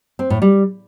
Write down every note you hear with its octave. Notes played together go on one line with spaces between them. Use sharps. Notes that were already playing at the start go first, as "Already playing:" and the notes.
C4
A2
G3